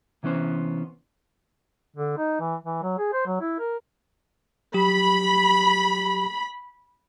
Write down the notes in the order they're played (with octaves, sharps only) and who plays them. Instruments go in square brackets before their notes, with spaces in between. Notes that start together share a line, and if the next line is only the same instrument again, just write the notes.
[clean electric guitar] C3 E3 B3 C#4 C5
[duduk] D3
D#4
E3
E3
F#3
G#4
C5
F#3
E4
A#4
[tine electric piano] F#3 G4 [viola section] B5